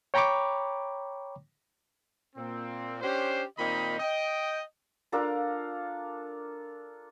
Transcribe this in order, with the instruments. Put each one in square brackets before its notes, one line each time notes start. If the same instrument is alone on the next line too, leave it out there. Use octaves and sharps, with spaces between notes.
[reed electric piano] C#5 G5 A#5 B5 C#6 D6
[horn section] A#2 C4
C#4 D4 G4 C5
A#2 D#3 C4 D#4 D#5 B5
D#5 G5
[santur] D4 F4 A4 A#4